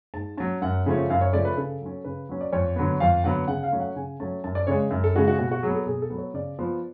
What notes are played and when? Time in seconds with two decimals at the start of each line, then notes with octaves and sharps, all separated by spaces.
0.14 G#2 A5
0.37 F#3 C#4 A5
0.62 F#2 F#5
0.86 C#3 F3 A3 C#4
1.10 F#2 F5
1.21 C#5
1.33 C#3 F3 A3 C#4 D5
1.45 B4
1.57 C#3 A4
1.81 F#3 C#4
2.04 C#3 B4
2.29 F#3 C#4
2.41 D5
2.52 F2 C#5
2.76 D3 F#3 B3
3.00 F2 F5
3.24 D3 F#3 B3 F#5
3.48 C#3 F#5
3.63 F5
3.72 F#3 A3 C#4
3.80 F#5
3.96 C#3 G#5
4.20 F#3 A3 C#4 A5
4.44 F#2 A5
4.55 D5
4.67 C#3 G#3 C#5
4.91 F#2
5.04 A4
5.15 C#3 G#3 F#4
5.28 F#4
5.38 B2 F#4
5.51 F#4
5.63 F#3 B3 G#4
5.74 A4
5.86 B2 G#4
6.02 A4
6.10 F#3 B3
6.18 C#5
6.34 C#3 D5
6.59 F3 B3